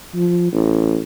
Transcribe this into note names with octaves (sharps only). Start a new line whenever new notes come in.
F3
A1